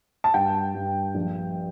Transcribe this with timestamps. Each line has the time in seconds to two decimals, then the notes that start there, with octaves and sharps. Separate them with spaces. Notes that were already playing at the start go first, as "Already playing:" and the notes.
0.24 A5
0.34 G2 G5
0.74 G2
1.15 A#1